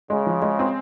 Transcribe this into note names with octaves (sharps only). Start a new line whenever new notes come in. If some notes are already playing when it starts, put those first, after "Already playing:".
C#3 G#3
F3
G#3
C4